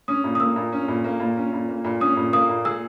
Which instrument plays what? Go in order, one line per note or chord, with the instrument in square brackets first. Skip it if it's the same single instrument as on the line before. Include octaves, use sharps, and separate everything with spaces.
[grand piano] C#4 [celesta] D#6
[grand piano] A#2
[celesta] D#6
[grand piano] A#3 [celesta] E6
[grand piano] A#2
C#4
A#2
A#3
A#2
C#4
A#2
A#3
A#2
[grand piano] C#4 [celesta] D#6
[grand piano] A#2
[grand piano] A#3 [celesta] D#6
[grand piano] A#2
[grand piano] G#4 [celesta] E6